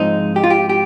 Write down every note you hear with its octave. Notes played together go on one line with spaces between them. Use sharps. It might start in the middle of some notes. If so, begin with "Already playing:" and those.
Already playing: G#2 F3 G#3 C4 D#4
G4
F4
G4
G4